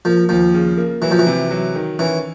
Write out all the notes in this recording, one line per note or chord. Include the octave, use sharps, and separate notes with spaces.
F3 A#3
D#2 F3
C#3
A#3
E3 F#3
F3
E3
C3
F#3
D#3
E3 C#4